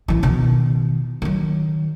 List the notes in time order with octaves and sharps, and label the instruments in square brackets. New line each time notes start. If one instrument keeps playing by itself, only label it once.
[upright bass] A1 E3
B2 D#3
D#3 F#3